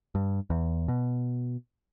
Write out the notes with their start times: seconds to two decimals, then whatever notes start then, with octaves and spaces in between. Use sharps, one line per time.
0.15 G2
0.50 E2
0.88 B2